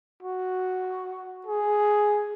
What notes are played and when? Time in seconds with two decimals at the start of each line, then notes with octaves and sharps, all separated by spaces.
0.23 F#4
1.47 G#4